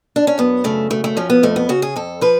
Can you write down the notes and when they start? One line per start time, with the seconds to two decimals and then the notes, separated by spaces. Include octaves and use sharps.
0.16 D4
0.27 C#4
0.38 F#2 B3
0.64 C#3 A3
0.90 F#2 A3
1.04 A3
1.17 F3 C#4
1.30 B3
1.43 F2 A3
1.56 B3
1.69 C#3 F#4
1.82 G#4
1.96 F2 A4
2.21 F3 B4